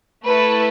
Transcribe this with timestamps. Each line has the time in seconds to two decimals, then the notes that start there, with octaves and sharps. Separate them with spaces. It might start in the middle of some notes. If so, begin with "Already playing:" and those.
0.27 A3 E4 A4 B4